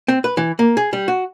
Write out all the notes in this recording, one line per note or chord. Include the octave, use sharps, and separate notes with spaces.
C4
B4
E3
A#3
G#4
G3
F#4